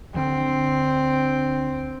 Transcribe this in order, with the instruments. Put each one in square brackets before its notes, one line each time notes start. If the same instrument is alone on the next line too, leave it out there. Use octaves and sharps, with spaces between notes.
[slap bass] D2 D3 D4 [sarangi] C4